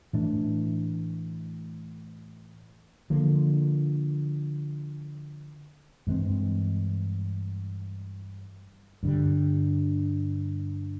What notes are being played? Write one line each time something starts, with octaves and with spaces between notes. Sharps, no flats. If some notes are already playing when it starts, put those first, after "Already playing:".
A2 E3 A3 D4
D3 F3 A#3
G2 E3 G#3 C4
G2 D3 G3